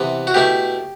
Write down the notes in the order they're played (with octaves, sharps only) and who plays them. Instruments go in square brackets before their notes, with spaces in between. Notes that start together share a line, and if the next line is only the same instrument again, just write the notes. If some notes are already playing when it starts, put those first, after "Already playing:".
Already playing: [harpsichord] C3 E3 B3
F#4
B2 A3 E4 G4